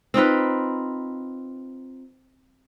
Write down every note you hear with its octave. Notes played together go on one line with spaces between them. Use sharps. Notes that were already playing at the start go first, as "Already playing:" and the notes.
C4 D#4 F4 B4